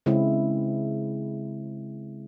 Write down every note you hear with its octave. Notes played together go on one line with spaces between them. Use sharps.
C#3 G#3 C4 E4